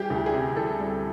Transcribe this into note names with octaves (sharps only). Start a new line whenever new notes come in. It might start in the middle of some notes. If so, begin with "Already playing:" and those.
Already playing: E3 G3 G4 G#4
D2
G4
G#4
C3
E3 A4
G3